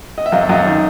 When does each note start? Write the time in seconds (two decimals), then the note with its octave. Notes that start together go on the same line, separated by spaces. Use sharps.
0.18 D#5
0.26 E5
0.32 F#2 D#5 F5
0.49 F#2 D#5 F5
0.67 D#3